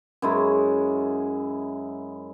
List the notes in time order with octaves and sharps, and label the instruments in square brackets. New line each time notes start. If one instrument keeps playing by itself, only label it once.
[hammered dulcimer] F#2 G#3 E4